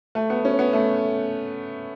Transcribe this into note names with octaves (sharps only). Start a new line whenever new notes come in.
A3
B3
C#4
B3
A3